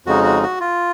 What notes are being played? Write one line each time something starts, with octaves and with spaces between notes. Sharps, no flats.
F2 C#3 G#3 D#4 F#4
F#4
F#4
F4